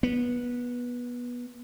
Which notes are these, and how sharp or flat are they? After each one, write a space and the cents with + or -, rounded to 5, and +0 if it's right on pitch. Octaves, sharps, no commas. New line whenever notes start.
B3 -20